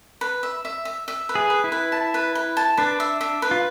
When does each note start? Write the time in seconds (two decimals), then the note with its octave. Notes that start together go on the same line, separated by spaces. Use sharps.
0.21 B4
0.43 E5
0.65 E5
0.85 E5
1.08 E5
1.29 B4
1.35 G#4
1.50 B4
1.64 E4
1.72 B4
1.92 A5
2.14 B4
2.35 B4
2.57 A5
2.77 D4 B4
3.00 E5
3.21 E5
3.42 B4
3.51 F4